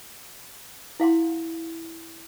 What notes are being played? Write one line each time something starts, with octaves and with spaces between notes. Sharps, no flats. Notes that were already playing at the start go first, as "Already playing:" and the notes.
E4 F5 F#5 C6